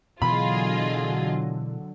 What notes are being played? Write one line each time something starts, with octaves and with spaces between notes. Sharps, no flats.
B2 D3 E3 F#3 F4 G#4 D#5 B5